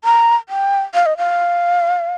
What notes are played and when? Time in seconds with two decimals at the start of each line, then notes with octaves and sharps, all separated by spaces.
0.04 A#5
0.49 G5
0.94 F5
1.06 D#5
1.18 F5